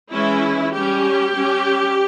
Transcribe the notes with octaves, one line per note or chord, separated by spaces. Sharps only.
E3 G#3 C#4 E4
G3 C#4 G4
G3 C#4